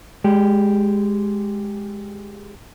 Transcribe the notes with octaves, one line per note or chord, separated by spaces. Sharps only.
G#3 G4